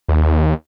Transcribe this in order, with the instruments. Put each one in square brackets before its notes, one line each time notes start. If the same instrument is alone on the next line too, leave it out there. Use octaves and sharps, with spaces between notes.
[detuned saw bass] D#2